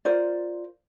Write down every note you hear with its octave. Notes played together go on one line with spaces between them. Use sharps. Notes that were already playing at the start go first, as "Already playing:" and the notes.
F4 A#4 C5 D5